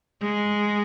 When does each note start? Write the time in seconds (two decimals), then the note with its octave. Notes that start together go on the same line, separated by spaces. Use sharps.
0.22 G#3